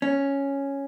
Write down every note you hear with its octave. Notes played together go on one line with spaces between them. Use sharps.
C#4